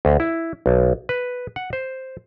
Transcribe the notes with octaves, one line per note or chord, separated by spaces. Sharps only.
D2
E4
B1
B4
F#5
C5